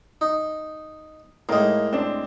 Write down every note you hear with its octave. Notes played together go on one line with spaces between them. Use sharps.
D#4
A2 G#3 A#3 D#4
C4 D4